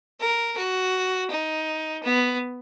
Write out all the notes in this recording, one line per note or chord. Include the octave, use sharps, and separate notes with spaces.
A#4
F#4
D#4
B3